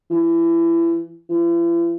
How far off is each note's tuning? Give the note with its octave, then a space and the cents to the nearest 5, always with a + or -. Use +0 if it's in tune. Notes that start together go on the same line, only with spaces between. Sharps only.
E3 +25
E3 +45